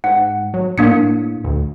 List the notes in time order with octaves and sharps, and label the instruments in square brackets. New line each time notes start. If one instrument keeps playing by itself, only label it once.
[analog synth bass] G#2 [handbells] F#5
[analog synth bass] F#3
[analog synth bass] A2 [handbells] A#3 D4 C#7
[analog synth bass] D2